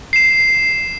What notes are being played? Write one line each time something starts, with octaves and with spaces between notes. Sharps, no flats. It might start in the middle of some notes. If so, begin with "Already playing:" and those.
C7 E7